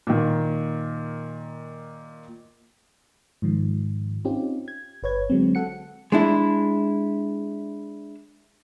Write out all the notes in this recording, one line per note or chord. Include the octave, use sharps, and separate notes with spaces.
A#2 D#3
G#2 D#3 F3
C4 C#4 D#4 F4 G4
G#6
G1 B4 C#5 G#6
D3 F#3 G#3 C4
A4 F#5 C#7
G#3 D4 E4